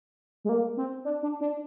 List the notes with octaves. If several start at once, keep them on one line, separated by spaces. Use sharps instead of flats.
G#3
A#3
C4
D4
D4
D4